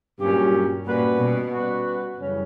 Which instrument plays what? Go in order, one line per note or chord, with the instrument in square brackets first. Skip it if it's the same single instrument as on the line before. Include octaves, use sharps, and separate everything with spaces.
[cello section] G2 [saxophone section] A#2 F#3 C#4 G4
[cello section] A#2 [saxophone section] G3 C#4 F#4 B4
[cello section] B2
[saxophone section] G3 C#4 F#4 B4
F#2 C#3 E3 G3 C#4